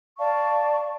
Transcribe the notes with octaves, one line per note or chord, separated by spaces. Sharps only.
D5 F5 A5 C#6